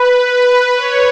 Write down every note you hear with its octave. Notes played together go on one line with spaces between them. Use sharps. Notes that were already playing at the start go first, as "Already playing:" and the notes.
Already playing: B4
B4
C#5